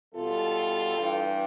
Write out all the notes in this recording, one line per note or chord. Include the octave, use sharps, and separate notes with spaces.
E2 B2 G3 F4 A4
G2 E3 G3